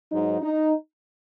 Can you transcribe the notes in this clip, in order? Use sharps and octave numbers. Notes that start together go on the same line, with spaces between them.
G#2 F#3 D#4
D#4